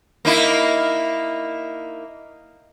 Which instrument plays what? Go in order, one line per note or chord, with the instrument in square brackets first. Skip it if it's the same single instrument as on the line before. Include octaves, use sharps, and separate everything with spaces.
[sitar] A#3 D#4 E4